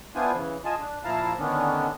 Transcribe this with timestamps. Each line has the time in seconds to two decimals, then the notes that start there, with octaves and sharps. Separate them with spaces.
0.15 B3 D4 E4 F4 C5 G#5
0.35 C#3 E3
0.65 F4 G#4 D#5 G#5 A5
0.79 D4
1.04 A#2 F3 E4 F5 A5 A#5
1.39 D3 D#3 B3 C#4 D4